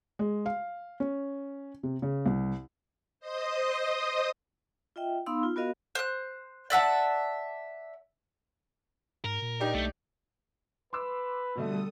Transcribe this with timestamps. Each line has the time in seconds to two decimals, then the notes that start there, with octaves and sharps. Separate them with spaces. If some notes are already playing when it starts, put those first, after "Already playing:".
0.19 G#3
0.46 F5
1.00 C#4
1.83 C3
2.02 C#3
2.26 C2
3.20 C5 D#5 D#6
4.96 F4 D#5 E5 G5
5.26 B3 D#4 F5 B5 C6 E6
5.43 F4
5.56 B3 F#4 A#4 D#5 F5
5.95 C5 F#6
6.70 D5 E5 F#5 A5
9.24 G#2 A#4
9.42 A#2
9.60 D4 D#4 G4
9.74 B1 A3
10.93 B4 C6 D6 E6
11.56 B2 D3 G3 A3 A4 D#6